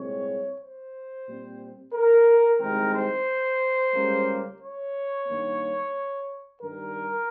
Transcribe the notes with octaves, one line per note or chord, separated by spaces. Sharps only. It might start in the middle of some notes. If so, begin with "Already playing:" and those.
Already playing: C2 A#2 G#3 C4 C#5
C5
A#2 G3 C4
A#4
C2 C3 D#3 G#3 C4 A#4
C5
C#2 C#3 G3 A#3
C#5
G2 D#3 A#3
G2 D#3 G3 A#4